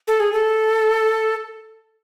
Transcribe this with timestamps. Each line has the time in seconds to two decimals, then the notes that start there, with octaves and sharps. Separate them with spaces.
0.08 A4
0.20 G#4
0.33 A4